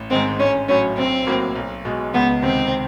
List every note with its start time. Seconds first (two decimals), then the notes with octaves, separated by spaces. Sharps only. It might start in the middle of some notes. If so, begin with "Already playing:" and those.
Already playing: A1
0.11 G#2 D#3 G#3 C4
0.39 A1 C#4
0.68 A2 F#3 A3 C#4
0.97 B1 C4
1.27 A2 F#3 A#3
1.56 B1
1.85 B2 G#3
2.14 C#2 B3
2.43 C3 D#3 C4